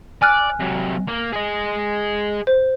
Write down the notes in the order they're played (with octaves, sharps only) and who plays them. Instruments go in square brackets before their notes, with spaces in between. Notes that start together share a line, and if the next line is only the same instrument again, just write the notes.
[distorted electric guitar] D5 [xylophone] G#5 F6 F#6
[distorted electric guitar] C3 F#3
A#3
G#4 D#5
[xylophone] C5